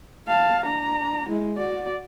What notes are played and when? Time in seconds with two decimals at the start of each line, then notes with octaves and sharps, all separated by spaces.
0.28 F5 A5
0.64 D4 A#5
1.29 G#3 E4
1.57 F#4 D5